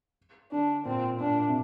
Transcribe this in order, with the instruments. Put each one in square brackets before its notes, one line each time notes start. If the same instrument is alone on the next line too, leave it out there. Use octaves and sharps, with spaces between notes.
[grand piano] D3 [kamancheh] D4
[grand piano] A#2 [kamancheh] C4
[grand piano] A#2 [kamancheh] D4
[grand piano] C3